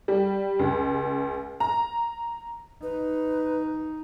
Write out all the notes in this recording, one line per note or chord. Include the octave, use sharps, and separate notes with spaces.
G3
C#2
A#5
D#4 B4